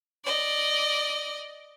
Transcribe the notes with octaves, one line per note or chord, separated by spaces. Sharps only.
D5 D#5